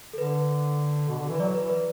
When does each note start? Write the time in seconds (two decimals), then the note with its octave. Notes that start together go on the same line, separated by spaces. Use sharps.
0.13 A4
0.18 D3 B4
1.08 B2
1.19 D3
1.29 E3
1.35 B4
1.40 F#3 D5
1.55 E3 B4
1.70 B4